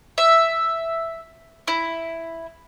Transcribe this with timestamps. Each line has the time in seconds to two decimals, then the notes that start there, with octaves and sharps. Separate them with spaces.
0.18 E5
1.68 E4